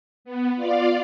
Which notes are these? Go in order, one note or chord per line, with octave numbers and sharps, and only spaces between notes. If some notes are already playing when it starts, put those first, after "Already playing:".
B3
F4 D5 F5